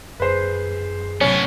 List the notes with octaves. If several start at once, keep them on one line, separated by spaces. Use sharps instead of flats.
F#2 G#4 B4 C5 C7
A2 C3 F#3 B3 C#4